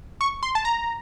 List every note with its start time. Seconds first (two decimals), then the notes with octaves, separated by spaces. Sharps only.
0.21 C#6
0.43 C6
0.55 A5
0.65 A#5